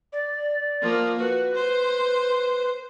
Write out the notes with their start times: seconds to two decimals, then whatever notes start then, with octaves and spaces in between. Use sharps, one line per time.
0.13 D5
0.82 F3 A#3
1.20 F#4 B4
1.55 C5